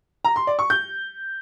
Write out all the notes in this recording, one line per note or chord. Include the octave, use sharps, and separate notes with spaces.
A#5
C6
D5
C#6
G6